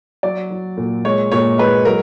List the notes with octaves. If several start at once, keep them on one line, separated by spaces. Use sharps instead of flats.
F#3 D5
F#3
A#2
G#3 C#5
A#2 C#5
G#3 B4
F#3 A#4